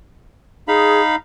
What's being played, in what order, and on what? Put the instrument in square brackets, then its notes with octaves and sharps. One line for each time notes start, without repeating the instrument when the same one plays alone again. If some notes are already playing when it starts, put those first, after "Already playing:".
[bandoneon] D#4 F5 B5 [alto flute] G#4